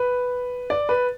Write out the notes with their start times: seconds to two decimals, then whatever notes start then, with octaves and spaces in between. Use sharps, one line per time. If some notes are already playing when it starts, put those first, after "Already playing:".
Already playing: B4
0.70 D5
0.89 B4